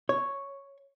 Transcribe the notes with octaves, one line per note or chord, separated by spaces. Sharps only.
C#5